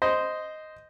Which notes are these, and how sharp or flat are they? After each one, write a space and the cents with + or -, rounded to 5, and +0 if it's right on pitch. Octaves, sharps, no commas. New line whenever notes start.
C5 -10 D#5 +0